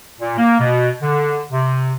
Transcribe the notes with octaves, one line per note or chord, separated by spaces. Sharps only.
A#2
A#3
B2
D3
C3